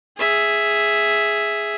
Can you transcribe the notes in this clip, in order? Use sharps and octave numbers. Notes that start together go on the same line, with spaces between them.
G#4 E5